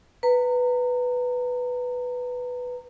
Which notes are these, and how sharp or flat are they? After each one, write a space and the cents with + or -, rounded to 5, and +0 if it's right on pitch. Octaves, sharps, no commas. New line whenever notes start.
B4 +0 A#5 -25